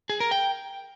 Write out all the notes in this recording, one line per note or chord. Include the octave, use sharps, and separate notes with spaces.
G#4
A#4
G5